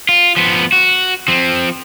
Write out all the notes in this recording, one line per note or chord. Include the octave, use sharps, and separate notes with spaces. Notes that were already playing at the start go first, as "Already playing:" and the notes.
F4
F3 B3
F#4
F3 C4